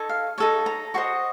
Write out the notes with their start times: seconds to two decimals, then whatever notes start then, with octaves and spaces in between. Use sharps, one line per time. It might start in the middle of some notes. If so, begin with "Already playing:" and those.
Already playing: D#4 A4 C#5
0.09 F5
0.38 D#4 A4 C#5 A5
0.66 A#5
0.94 F#4 C5 D#5 C#6